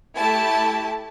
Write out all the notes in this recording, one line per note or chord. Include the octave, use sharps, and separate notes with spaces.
A3 E4 G4 A5